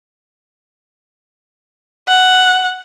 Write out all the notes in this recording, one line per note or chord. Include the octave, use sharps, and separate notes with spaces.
F#5